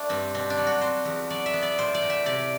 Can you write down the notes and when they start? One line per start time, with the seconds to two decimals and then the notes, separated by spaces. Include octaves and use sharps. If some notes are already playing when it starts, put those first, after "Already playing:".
Already playing: A3 D4
0.09 G2 C4
0.34 B2 C4
0.50 D4
0.57 F#3
0.67 F#4
0.81 C4 C5
1.05 E2
1.30 F#3 D5
1.46 E5
1.53 B3
1.62 D5
1.78 A2 C5
1.94 D5
2.02 A2
2.10 E5
2.26 C3 D5